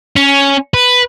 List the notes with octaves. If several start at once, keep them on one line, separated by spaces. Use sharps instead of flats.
C#4
B4